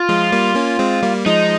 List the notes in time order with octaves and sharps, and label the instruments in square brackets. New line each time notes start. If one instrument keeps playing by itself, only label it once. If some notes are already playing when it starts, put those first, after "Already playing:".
Already playing: [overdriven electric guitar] F4
[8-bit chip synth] F3 G#3
G3 A#3
A#3 C#4
G#3 C4
G3 A#3
[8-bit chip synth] F3 G#3 [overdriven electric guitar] D#4